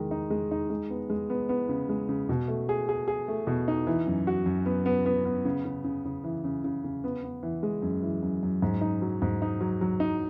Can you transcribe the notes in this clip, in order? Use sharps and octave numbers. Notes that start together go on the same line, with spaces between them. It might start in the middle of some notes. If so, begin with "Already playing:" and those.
Already playing: D#3 G#3
D#4
G#3
D#4
G#3
B3
G#3
B3
B3
C#3
G#3
C#3
B2
A3
G#4
G#4
G#4
A3
B2
D#4
E3
F#2
F#4
F#2
B3
B3
B3
B3
C#3
C#3
C#3
C#3
E3
C#3
C#3
C#3
B3
B3
E3
G#3
F#2
E3
F#2
F#2
G#2
D#4
F#3
G#2
D#4
F#3
F#3
D#4